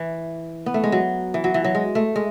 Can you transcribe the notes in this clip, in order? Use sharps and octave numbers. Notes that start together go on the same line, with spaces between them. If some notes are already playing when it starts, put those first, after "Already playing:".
Already playing: E3
B3
A3
G#3
F#3
E3
F#3
E3
F#3
G#3
A3
G#3